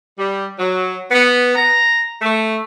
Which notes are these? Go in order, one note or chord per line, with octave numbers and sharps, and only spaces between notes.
G3
F#3
B3
A#5
A3